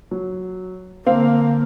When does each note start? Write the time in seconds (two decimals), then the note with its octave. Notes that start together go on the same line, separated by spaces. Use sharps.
0.11 F#3
1.06 D3 A#3 C4 F5